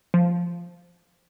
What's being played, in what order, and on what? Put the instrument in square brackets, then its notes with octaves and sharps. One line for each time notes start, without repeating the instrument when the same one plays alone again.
[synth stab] F3